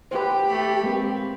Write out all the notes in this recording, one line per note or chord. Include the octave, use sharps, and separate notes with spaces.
G4 B4 C5
A3 B5
G#3 A#3 C4 B4